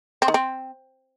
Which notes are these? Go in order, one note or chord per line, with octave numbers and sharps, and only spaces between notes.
C4
D#3
C4